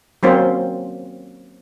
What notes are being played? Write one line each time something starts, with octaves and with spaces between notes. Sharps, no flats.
F#3 A#3 C4 C#4 F4 C5